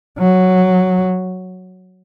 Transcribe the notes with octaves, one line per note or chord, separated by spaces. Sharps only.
F#3